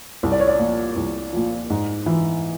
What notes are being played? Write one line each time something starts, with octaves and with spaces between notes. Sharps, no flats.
C2
D5
C#5
D5
A#2
F3
C2
A#2 F3
G#2
E3